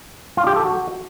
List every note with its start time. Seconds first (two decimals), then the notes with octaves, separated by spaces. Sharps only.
0.37 F4
0.47 G4
0.56 A4
0.65 F#4